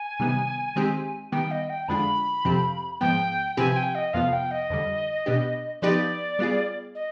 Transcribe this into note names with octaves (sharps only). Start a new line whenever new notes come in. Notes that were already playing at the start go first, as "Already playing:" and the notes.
Already playing: G#5
C3 D#3 G3 B3
D#3 G#3 C4 G4
D#3 G3 B3 G5
D#5
G5
F2 D3 G#3 D4 F4 B5
F2 C3 F3 C4 G4
G#2 F3 B3 G5
C3 F3 C4 G4 B4 G#5
G5
D#5
F2 C3 F3 B3 F4 F5
G5
D#5
F2 D3 G3
B2 B3 D4 G4
F3 B3 D#4 G4 B4 D5
G3 B3 F4 G#4
D#5